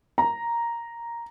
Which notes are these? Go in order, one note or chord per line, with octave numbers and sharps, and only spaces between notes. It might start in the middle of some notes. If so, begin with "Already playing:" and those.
A#5